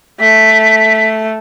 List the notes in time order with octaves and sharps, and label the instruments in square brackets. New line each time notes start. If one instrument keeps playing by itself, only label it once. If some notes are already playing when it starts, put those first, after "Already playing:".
[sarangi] A3 [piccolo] B6